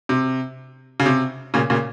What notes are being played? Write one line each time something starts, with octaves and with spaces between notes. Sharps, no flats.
C3
C#3
C3
A#2 C#3
A#2 C#3